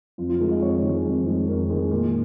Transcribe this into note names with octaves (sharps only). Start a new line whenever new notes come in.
F2 F4
F4
D#3 G#3 A#4
D#5
F2 C#5
D#3 G#3
F2
D#3 G#3
F2 A#4
D#3 G#3
A#2